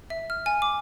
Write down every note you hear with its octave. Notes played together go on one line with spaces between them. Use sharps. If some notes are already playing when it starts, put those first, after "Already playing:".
E5
F6
G#5
D6